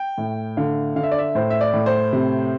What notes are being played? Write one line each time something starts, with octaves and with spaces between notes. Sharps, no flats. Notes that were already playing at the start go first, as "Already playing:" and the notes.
Already playing: G5
A2
D3 F5
D3 F5
E5
D5
E5
A2 C5
E5
D5
A2
C5
C3